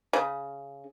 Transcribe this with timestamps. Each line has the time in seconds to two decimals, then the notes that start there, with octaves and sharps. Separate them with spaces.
0.13 C#3